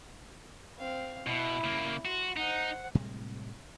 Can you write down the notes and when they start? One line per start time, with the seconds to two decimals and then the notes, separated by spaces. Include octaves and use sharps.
0.78 C4 F5
1.27 B2 E4
1.64 C#3 A#3
2.05 F#4 C6
2.37 D#4 C5 F#5
2.95 A2 C3 G3 G#3